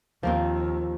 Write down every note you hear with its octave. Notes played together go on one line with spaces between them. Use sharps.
D#2 F3 A#3 C4